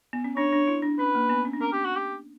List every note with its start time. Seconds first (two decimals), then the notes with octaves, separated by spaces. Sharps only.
0.13 B3
0.24 C#4
0.36 D4 C#5
0.52 D4
0.68 E4
0.82 D4
0.99 C#4 B4
1.15 A#3
1.29 B3
1.45 C#4
1.53 D4
1.60 C#4 A#4
1.73 G4
1.85 F#4
1.96 G4